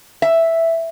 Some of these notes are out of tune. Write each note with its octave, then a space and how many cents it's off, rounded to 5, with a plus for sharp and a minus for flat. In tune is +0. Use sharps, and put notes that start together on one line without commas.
E5 +0